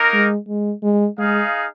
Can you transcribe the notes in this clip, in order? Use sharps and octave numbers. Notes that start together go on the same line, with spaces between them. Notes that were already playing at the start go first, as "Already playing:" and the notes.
Already playing: A#3 D#4 A#4
G#3
G#3
G#3
G#3 D#4 G#4 F5